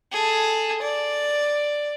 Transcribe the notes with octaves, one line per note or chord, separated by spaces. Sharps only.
G#4 A4
D5